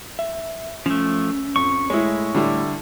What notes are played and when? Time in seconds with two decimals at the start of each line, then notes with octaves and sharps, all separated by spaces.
0.19 E5
0.86 F3 A3 C#4
1.56 F2 C#6
1.90 A2 G#3 E4 C#5
2.35 D3 G3 E4